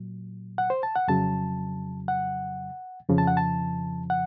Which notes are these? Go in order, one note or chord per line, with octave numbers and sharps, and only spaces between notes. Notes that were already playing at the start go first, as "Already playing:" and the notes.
Already playing: A#2 F#3
F#5
C5
A5
F#5
F2 C#3 F#3 A5
F#5
F2 C#3 F3
A5
F#5
A5
F#5